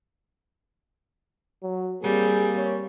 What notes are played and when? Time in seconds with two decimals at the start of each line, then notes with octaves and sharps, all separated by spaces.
1.63 F#3
2.03 G3 A#3 C4 G#4
2.57 C#5